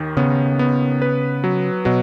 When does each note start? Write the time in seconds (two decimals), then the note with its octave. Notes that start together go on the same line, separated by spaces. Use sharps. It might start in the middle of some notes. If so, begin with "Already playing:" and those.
Already playing: D#2 D#3
0.17 C#3 B3
0.59 B3
1.02 B4
1.44 F#3
1.85 B2 F#3